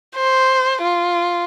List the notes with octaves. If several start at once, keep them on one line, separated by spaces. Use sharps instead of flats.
C5
F4